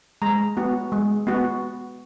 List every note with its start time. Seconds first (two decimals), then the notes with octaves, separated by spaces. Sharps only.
0.22 G#3 A#5
0.57 B3 F#4
0.92 G#3
1.27 B3 F#4